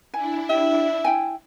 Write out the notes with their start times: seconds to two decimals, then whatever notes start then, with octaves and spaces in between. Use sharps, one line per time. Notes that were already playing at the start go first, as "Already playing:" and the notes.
0.14 D4 E4 G#5
0.49 G4 E5
1.04 E4 G5 G#5